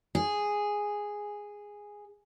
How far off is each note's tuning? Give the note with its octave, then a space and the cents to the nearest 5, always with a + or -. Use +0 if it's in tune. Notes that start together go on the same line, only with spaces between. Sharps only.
G#4 -5